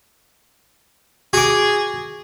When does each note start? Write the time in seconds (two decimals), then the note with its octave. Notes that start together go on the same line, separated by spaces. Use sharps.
1.33 F#4 G#4 D6